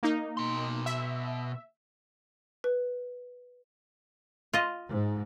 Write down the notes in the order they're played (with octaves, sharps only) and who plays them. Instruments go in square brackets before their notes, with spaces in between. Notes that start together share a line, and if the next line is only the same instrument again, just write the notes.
[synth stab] A#3 D#4
[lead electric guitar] B2 C6
[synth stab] E5
[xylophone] B4
[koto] F4 D#5
[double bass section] G#2